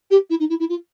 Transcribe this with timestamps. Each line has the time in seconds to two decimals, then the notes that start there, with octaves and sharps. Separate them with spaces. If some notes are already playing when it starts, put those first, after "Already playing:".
0.10 G4
0.29 E4
0.39 D#4
0.49 E4
0.59 E4
0.69 F4